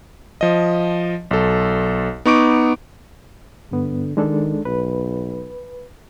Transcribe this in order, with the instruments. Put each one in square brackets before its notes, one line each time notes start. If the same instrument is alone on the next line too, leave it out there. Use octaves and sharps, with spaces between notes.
[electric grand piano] F3 D#5
B1 A4
B3 D#4 C#6 D6 D7
[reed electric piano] G2 B3 [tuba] D3
[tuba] D#3 [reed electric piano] G#3 D4 A4
[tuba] B1 [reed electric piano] B4